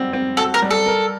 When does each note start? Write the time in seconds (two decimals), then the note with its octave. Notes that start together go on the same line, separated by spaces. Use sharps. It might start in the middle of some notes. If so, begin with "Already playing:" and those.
Already playing: G3 C4 F#4
0.13 C4
0.37 F#4 A4
0.54 A#4
0.62 G3
0.71 A4
0.86 A#4